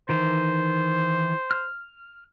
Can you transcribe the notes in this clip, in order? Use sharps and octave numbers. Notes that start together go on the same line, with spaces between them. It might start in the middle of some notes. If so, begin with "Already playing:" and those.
D#3 E3 C5
F6